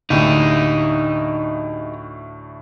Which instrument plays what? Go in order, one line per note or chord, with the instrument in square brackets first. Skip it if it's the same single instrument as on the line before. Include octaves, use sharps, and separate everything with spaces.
[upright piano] D2 A2 D3 [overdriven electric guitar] D#4 G4